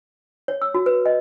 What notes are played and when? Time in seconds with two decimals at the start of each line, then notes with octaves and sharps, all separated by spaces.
0.48 C#5
0.62 E6
0.74 F#4
0.86 B4
1.06 D#5